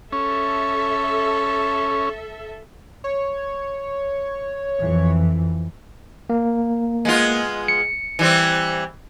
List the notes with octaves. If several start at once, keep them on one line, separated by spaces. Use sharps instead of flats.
C#4 A4 E5
C#5
F2 E3
A#3
G#3 B3 F4
C#7
E3 G3 C4